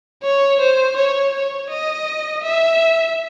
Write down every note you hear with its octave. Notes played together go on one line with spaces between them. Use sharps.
C#5
C5
C#5
C#5
D#5
E5